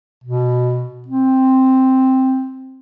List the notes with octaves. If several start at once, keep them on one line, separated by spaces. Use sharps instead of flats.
B2
C4